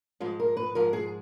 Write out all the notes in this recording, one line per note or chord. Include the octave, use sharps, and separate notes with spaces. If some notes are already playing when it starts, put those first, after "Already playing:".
G#2 F3 G#3
A#4
B4
G#2 F3 G#3 A#4
G#4